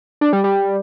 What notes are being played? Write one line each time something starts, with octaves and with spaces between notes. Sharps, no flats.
D4
G3
G3